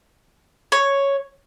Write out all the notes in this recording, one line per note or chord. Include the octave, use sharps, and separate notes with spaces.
C#5